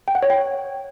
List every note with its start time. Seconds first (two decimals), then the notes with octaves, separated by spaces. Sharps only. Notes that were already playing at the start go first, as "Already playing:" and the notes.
0.08 G5
0.15 F#5
0.23 C#5
0.30 G5